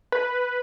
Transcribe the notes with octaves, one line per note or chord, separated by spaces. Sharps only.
B4